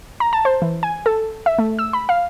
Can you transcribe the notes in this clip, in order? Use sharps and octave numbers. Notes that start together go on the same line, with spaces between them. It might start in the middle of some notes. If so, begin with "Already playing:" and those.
A#5
A5
C5
E3
G#5
A4
E5
A3
E6
B5
F5